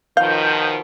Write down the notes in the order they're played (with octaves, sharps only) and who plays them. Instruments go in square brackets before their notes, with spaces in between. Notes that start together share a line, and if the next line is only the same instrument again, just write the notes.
[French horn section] B2 D#3 F3 [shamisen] F5 [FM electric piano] G6